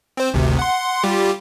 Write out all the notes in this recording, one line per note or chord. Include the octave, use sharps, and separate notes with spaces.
C4 C5
G#1 D2 C3
F#5 C6
G3 F4 G4